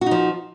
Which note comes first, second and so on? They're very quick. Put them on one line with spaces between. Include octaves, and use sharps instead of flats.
F#4 D#4 F3